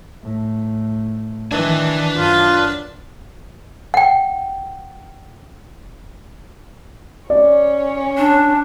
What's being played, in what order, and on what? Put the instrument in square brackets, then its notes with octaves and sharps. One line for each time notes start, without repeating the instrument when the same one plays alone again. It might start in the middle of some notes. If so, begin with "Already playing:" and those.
[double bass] A2
[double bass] D#3 E3 [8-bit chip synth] D4 [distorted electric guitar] B4 G#5
[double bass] F#2 [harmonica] F4
[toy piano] F#5 G5
[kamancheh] C#4 C#5 [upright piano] D5
[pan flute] D4